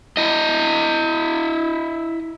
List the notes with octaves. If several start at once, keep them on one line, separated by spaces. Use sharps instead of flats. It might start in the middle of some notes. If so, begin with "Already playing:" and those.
E4 D#5